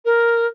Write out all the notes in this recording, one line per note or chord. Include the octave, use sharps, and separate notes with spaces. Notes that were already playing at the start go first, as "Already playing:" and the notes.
A#4